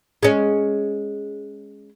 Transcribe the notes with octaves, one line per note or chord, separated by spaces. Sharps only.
G#3 C#4